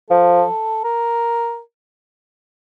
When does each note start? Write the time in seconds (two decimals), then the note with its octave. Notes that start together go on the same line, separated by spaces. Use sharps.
0.10 F3 A4
0.84 A#4